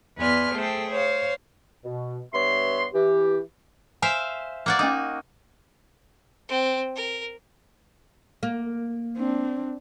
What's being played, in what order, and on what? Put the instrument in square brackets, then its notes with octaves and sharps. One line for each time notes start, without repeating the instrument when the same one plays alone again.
[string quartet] E2 B4 D5 G#5 C6 F6
A3 G#4 A4 C5 G5
C5 C#5 F5
[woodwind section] B2
G2 B3 C#5 E5 C6
E3 G4
[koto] C5 E5 F5 [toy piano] G#5
[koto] A#3 F#4 D5
[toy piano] C#4 D6 [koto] D#4
[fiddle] C4
A#4
[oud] A#3
[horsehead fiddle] C4 D4